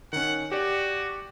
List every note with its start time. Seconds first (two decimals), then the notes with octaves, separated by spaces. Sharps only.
0.13 D#3 C#4 F#5
0.52 F#4 G4 D5